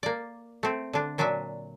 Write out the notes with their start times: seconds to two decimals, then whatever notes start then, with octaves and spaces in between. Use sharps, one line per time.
0.03 A#3 D5
0.63 A3 C4
0.93 D3 D4
1.18 A#2 F#3 D4 E5 G#5